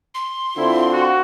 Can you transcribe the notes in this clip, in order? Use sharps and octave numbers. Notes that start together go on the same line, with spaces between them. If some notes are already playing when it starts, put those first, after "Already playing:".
C6
D3 C4 E4 F4
F#4